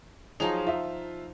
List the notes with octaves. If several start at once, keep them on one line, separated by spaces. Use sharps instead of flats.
F3 F#3 D#4 G#4 F7
F4 E5